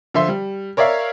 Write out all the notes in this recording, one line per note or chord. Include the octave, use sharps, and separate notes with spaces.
D3 F3 E5 C6
G3
A#4 C#5 D5 E5 F5